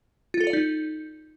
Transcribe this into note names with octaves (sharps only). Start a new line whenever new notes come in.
F4
A4
D5
D#4